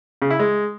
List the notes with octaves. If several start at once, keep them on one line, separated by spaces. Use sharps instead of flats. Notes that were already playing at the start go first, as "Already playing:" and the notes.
C#3
E4
G#3